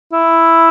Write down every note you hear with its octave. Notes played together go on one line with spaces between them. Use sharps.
E4